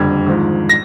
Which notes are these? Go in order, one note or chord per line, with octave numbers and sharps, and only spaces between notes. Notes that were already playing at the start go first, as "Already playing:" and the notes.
Already playing: F#1 F2 D3 G3 G#6
G#1 G#2 F3
A#6